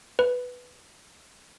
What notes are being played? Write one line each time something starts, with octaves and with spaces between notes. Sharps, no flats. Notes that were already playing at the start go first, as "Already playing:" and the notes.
B4